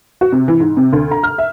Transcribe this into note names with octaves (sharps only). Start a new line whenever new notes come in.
F#4
C3
E3
G#2
C3
D2
A#5
F6
E5